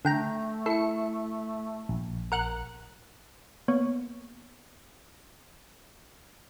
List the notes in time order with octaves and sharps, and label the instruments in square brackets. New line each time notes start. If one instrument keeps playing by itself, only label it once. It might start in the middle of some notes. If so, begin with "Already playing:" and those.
[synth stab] D3 G5 A#5 [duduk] A3
[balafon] E4 E5 [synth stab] A4 C#7
[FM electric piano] A#1
[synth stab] A#4 F#5 F#6
[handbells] A#3 B3 C#5 C#6